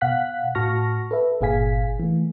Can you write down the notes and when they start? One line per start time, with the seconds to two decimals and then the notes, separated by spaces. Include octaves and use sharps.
0.01 B2 F5 F#5 F#6 B6
0.55 A2 F#4 A5 C#6 F6 A#6
1.11 A4 B4 E5
1.41 G1 A#2 G#4 F5 G#5 B6
2.00 E3 A3